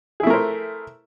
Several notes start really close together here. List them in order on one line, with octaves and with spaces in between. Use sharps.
G#4 E4 A3 A#4 C5